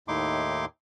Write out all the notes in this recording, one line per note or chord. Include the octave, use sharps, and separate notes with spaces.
D#2 A2 D#4 E4 C6 D6